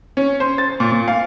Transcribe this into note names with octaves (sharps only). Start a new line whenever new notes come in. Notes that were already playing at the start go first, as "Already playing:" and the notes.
C#4
C5
A6
A#2
A#2
F5